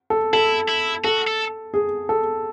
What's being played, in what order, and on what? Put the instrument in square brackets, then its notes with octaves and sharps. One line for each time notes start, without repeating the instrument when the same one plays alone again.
[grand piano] A4
[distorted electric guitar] E4 [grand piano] A4
[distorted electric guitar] E4
[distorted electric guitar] F#4 [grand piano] A4
[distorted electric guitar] A4
[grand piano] G#4
A4